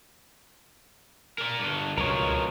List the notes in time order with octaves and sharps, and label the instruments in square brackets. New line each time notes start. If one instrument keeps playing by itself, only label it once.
[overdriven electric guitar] A#4 D5
G2 D3
[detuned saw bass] C#2 [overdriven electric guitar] B2 F3 [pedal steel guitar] A#4 C#5